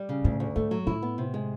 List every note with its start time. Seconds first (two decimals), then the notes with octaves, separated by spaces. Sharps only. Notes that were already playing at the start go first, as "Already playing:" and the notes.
Already playing: G3
0.09 C#3
0.24 D2 A2
0.40 D2
0.56 G#2 A3
0.71 F#3
0.87 A2 E4
1.02 B3
1.18 C3
1.34 G#3